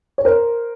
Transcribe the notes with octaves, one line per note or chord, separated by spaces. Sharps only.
C#5
A#4 C5